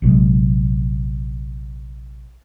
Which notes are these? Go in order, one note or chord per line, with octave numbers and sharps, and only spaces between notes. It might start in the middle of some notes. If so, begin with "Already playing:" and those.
A#1 C3 F#3 G#3